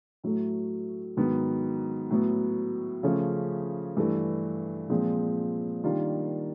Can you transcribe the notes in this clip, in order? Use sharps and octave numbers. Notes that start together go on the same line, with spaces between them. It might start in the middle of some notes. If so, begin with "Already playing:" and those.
A2 F#3 A3
G#2 D#3 F#3 B3
A2 F#3 B3
C#3 F3 A3 C#4
G2 E3 A3
A#2 F3 G#3 C4
D#3 G3 A#3 D4 F4